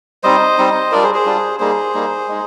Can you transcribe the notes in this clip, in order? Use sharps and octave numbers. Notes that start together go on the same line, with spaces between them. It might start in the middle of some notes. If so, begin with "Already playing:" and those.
G3 C4 D#4 C5 D#5
G3 C4 D#4
G3 D4 F4 A#4 D5
G#4 C5
G#4 C5
G3 D4 F4
G3 A#3 D#4 G#4 C5
G3 A#3 D#4
G#3 D#4